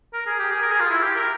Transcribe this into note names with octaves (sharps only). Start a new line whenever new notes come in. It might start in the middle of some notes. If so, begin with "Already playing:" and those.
A#4
G#4
G4
G#4
A#4
G#4
F4
E4
G4
A#4